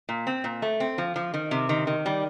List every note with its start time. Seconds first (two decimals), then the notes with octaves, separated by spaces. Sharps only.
0.09 A#2
0.27 C4
0.44 A#2
0.62 A3
0.80 C4
0.98 F3
1.16 F3
1.34 D#3
1.51 C3
1.69 D#3
1.87 D#3
2.06 G3